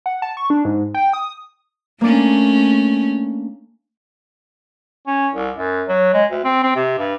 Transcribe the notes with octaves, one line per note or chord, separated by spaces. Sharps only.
F#5
A5
C#6
D4
G#2
G5
D#6
A3 A#3 C#4 D4
C#4
C2
F#2
F#3
G#3
D2
C4
C4
C3
G2